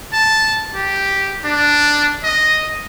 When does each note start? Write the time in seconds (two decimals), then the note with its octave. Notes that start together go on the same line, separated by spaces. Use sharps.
0.13 A5
0.75 G4
1.45 D4
2.23 D#5